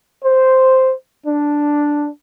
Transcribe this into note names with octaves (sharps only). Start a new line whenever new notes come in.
C5
D4